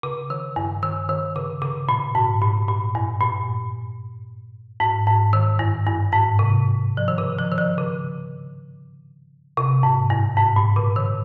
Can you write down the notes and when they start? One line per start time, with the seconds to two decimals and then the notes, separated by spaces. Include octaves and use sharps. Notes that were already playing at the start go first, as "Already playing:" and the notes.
0.03 C#3
0.30 D#3
0.56 G2
0.83 D#3
1.09 D#3
1.36 C#3
1.62 C#3
1.89 A#2
2.15 G#2
2.42 A#2
2.68 A#2
2.95 G2
3.21 A#2
4.80 G#2
5.07 G#2
5.33 D#3
5.59 G2
5.87 G2
6.12 G#2
6.39 C3
6.97 F3
7.08 D#3
7.18 C#3
7.39 F3
7.52 D#3
7.58 F3
7.78 C#3
9.57 C3
9.83 G#2
10.10 G2
10.37 G#2
10.56 A#2
10.76 C#3
10.96 D#3